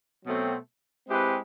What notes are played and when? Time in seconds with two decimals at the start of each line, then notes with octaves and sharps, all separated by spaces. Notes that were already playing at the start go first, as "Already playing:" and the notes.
0.25 B2 F#3 A3 C4
1.09 G#3 C4 E4 G4 B4